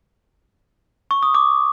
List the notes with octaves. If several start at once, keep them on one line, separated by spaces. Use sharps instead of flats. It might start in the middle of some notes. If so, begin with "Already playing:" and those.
C#6
D#6
D6